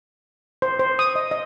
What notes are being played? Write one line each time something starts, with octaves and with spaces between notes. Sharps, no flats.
C5
C5
D#6
D#5
D#5